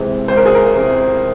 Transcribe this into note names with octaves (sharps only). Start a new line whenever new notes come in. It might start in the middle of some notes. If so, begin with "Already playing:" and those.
Already playing: C#2 C3 E3 G#3 C4
C#2 C5
A#4
G#4
A#4
C3 E3 G#3 C4